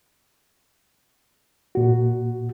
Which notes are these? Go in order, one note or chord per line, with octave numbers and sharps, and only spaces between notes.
A#2 F#4